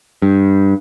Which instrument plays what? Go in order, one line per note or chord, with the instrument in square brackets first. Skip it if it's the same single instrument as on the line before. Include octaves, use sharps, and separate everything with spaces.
[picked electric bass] G2